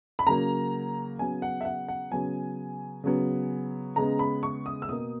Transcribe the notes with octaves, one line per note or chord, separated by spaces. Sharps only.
B5
C#3 F#3 A#3 A#5
C#3 F#3 B3 G#5
F#5
E5
F#5
F#5
C#3 F#3 B3 G#5
C#3 F#3 B3
C#3 G#3 B3 A#5
B5
C#6
D#6
E6
B2 A#3 D#6